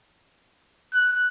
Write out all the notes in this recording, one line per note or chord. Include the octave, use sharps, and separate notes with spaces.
F#6